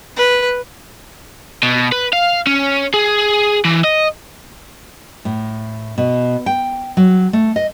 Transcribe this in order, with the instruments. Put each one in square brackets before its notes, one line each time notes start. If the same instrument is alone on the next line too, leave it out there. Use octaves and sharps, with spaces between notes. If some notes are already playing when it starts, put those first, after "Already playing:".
[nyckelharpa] B4
[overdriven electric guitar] B2
B4
F5
C#4
G#4
E3
D#5
[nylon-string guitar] A2
B2
G5
F#3
A3
D#5